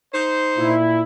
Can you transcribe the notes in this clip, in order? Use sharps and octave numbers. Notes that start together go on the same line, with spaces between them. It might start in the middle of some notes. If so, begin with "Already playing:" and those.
D#4 C5
A#2 E4